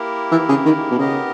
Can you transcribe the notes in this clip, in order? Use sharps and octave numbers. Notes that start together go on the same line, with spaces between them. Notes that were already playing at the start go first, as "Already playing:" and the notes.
Already playing: A#3 E4 G4 A#4
E3
C#3
D#3
B2
C#3 B3 G4 A#4 D#5